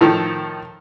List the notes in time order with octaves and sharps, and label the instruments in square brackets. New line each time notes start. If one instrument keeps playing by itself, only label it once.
[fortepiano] A2 D#3 F3 A4